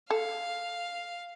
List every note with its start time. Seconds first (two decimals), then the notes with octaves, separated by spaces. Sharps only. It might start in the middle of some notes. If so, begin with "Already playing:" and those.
0.10 A4 F5